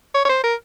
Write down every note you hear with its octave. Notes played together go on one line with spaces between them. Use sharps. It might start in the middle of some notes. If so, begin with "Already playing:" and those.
C#5
C#5
C5
A#4